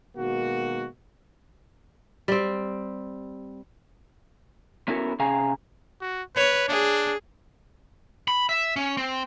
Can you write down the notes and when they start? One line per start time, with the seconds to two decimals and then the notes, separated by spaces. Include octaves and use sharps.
0.16 B2 D#3 G#3 A#3 F#4
2.28 G3 C4
4.88 B3 C#4 E4 F#4 A4 A#4
5.19 C3 C#4 G#4 F5 G#5 A#5
6.01 F#4
6.36 B4 C#5
6.68 D4 G#4
8.28 B5
8.49 E5
8.76 C#4
8.97 C4